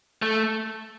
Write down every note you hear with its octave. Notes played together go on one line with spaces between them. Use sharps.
A3